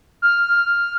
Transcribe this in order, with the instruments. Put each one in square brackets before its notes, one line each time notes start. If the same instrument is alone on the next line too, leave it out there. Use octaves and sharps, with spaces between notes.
[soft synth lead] F6